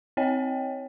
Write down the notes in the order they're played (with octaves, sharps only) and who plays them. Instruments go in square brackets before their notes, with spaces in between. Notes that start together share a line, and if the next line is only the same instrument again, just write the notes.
[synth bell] C4 C#5 D#5 G5